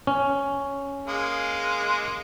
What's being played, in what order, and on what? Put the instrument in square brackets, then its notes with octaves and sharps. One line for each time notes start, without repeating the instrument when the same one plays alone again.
[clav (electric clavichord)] C#4
[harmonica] G#3 A#3